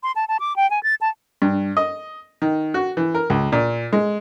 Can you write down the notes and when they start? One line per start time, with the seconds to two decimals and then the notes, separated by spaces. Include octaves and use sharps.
0.03 C6
0.16 A5
0.28 A5
0.40 D6
0.56 G5
0.70 G#5
0.83 A6
1.01 A5
1.42 G2
1.77 D#5
2.42 D#3
2.74 F#4
2.97 E3
3.15 A#4
3.30 C#2
3.52 A#2
3.93 G#3